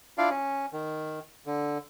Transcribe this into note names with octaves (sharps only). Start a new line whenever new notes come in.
D4 E4 F4 D5 F5
C#4
D#3
D3